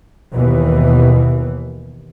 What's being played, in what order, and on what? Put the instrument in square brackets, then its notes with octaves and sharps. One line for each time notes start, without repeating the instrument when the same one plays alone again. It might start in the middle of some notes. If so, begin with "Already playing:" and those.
[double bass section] D#2 B2 E3